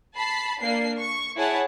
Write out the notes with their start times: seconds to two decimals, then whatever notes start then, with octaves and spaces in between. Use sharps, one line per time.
0.15 A5 B5 C7
0.61 A#3 D4 C7
0.99 C#6
1.36 E4 G#4 C#5 F#5 A5